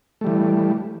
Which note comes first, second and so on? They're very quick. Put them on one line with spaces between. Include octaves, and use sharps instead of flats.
A3 G3 E3